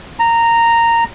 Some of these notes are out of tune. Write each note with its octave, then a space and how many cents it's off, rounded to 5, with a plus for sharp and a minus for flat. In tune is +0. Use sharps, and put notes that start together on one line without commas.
A#5 -10